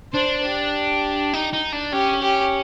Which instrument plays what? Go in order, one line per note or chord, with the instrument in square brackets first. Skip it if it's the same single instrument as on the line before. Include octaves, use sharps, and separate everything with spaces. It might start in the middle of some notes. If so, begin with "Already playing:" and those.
[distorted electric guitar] D4 [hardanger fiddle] C5
[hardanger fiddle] G4
[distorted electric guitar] D#4
D#4
D4
[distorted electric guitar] C#4 [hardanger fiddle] G4
[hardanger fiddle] G4